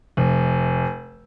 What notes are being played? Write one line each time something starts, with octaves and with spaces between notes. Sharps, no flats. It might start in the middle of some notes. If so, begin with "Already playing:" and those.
F1